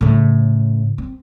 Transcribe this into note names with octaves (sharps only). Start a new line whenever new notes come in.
A2 C#3
C4